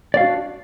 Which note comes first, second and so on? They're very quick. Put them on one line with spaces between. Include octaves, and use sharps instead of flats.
D5 F5 F#4 D4